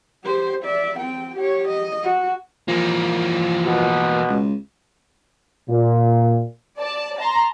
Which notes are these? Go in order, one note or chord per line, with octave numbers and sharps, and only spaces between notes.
G4 C5
D5 E5
C4 G5
G4 C#5
D#5
F#4
E3 F3 A#3
B2
C#2
A#2
D5 A5
A5 A#5 C6